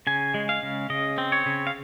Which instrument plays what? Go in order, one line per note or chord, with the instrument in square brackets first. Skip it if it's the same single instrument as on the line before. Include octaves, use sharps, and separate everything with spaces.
[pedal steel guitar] C#3 G#5
G#3
F5
C#3
C#3 D#5
C4
C#5
C#3
F5